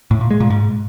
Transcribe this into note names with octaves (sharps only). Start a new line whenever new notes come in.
A2
A#2
G#3
A#2
G#2